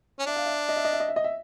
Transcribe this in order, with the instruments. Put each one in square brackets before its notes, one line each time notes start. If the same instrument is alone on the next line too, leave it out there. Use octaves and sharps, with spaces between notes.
[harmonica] C#4
[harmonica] D4 [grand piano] E5
[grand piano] F5
E5
D#5
E5
D#5
E5
D#5
E5
D#5
E5